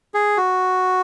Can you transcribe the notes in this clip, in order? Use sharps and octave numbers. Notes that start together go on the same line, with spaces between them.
G#4
F#4